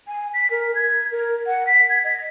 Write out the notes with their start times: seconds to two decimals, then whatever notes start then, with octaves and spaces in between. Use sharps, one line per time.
0.07 G#5
0.33 B6
0.50 A#4
0.75 G#6
1.11 A#4
1.46 F#5
1.66 B6
1.89 G#6
2.04 D#5